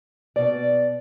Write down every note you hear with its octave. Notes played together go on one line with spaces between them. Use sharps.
B2 D5